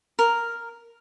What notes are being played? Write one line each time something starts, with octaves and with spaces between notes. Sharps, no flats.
A#4